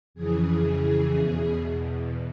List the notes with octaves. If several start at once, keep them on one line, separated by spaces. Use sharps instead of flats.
F2 C#3 E3 G#4
E2 B2